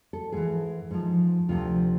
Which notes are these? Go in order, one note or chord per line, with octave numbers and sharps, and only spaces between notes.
A4
G#2 E3 G#4
G#2 F3
D2 C3 F3 F4